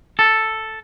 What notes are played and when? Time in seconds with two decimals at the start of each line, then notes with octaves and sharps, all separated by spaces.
0.19 A4